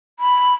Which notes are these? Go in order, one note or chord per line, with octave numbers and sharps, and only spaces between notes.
B5